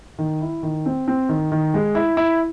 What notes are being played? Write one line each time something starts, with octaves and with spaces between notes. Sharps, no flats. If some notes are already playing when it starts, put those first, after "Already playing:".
D#3
E4
D#3
C4
C4
D#3
D#3
G#3
E4
E4